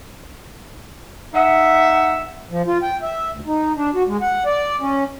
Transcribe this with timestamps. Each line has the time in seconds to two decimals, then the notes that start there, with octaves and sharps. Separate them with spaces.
1.35 D#4 E5 F#5
2.51 F3
2.67 F4
2.83 G5
3.02 E5
3.32 D2
3.47 D#4
3.76 D4
3.94 F#4
4.07 G#3
4.22 F#5
4.46 D5
4.81 C#4